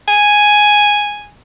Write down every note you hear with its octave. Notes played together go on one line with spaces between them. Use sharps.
G#5